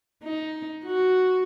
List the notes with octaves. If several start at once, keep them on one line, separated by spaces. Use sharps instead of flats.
D#4
F#4